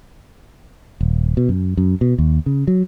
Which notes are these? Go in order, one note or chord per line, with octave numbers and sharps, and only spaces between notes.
D#1
B2
F#2
F#2
B2
D#2
C#3
F#3